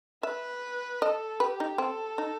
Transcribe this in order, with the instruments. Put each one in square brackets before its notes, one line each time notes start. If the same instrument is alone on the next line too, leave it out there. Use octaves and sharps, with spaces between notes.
[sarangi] B4 [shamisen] E5
[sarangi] A4 [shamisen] D#5
[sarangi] G4 [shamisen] B4
[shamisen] D#4
[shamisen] C4 [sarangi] A4
[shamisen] D#4